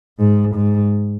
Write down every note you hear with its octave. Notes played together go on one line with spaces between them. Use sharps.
G#2
G#2